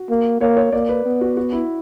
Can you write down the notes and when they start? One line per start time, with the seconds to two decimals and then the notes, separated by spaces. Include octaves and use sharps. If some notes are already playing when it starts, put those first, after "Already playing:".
Already playing: F#4
0.10 A#3
0.41 A#3 C#5
0.57 C#5
0.72 A#3 D5
0.89 B4
1.05 B3
1.21 F#4
1.37 F#4
1.53 E4